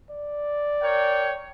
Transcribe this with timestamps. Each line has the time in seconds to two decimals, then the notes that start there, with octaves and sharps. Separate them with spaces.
0.10 D5
0.82 A#4 C#5 G5